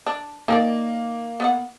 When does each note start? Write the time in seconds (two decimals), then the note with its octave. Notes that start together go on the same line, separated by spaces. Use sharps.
0.07 D4
0.48 D#3 A#3 G#4 D5
1.40 B3 B4 F#5